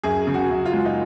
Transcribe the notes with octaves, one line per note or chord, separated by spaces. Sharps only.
F#2 G#4
C#3
F#4
F#2
F4
G#3
D#4